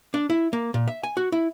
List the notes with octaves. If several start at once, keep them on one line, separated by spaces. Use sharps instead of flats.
D4
E4
A#3
A#2
E5
G#5
F#4
E4